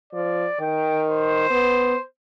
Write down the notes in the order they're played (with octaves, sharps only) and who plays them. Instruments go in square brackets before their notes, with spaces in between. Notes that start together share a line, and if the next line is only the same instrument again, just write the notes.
[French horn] F3 [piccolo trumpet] D5
[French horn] D#3 [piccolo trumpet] G5
[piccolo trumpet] C5
[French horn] B3